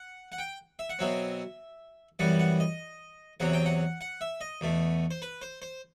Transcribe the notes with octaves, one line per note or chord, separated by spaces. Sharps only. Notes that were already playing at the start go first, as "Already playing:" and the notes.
Already playing: F#5
F#5
G5
E5
F#5
B2 F#3 C4 E5
F#2 E3 G3 B3 F#5
F#5
D#5
E2 C3 F#3 F#5
G5
F#5
F#5
E5
D#5
E2 B2 A3
C5
B4
C5
C5